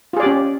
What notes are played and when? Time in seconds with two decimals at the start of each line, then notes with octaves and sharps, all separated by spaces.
0.13 F4
0.17 G#4
0.20 D5
0.23 G4
0.26 C#4